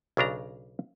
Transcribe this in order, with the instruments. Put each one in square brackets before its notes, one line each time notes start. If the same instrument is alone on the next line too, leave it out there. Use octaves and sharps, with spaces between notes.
[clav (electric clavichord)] B1 C#3 D4 A#5